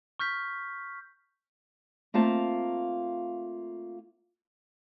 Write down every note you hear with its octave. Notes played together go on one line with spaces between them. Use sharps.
C#6 F6 G6 B6
A3 A#3 C4 F4 A5